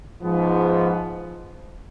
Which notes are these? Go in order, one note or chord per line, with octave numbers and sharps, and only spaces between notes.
G#2 F3 B3